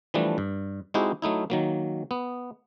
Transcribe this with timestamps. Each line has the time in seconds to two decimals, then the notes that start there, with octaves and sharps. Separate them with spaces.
0.14 E3 F3 G3 A3 D4
0.38 G2
0.94 G#3 C4 D#4 E4 F#4 G4
1.22 F#3 A3 D#4 E4
1.50 D#3 F#3 A#3
2.11 B3